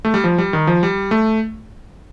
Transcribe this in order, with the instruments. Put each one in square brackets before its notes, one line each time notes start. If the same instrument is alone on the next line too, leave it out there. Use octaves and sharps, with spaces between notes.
[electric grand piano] A3
G3
F3
G3
D#3
F3
G3
A3